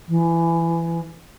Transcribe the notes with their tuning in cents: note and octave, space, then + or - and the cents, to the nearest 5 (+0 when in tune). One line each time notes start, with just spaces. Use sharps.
E3 +20